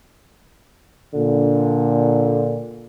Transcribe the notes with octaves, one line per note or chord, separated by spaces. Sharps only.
A#2 D3